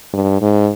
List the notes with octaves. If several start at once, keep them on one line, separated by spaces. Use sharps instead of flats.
G2
G#2